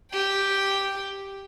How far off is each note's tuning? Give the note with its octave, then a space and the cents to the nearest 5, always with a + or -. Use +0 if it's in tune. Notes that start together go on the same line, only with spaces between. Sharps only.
G4 +0 G5 +0